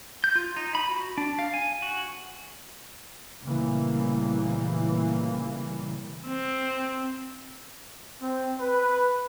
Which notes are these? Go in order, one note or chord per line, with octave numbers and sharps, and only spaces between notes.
G6
F4
D#4
B5
F#4
D4
F5
G#5
F#4
F1 A#2 C#3 E3 G3 A#3
C4
C4
B4